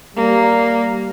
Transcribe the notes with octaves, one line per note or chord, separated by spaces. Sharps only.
G3 A#3